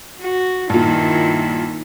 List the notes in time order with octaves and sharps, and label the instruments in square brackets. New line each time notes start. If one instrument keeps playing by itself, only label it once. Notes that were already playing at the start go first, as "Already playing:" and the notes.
[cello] F#4
[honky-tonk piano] G2 A#2 [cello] D#3 E4